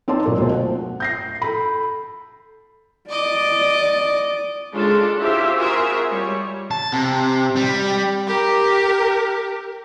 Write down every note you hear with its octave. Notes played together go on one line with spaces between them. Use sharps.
C4 D#4 C#5 D5 A5 C6
A#2 F#3 A#3
D2 B2 C5
F#5
G6 A#6 C7
A4 B5
D5 D#5 D6
C#3 G#3 D4 F4 A4
E4 F4 G4 C5 E5
C4 F4 F#4 G#4 A#4 E5
G3 C#5
A5
C3
G3
G4 A#4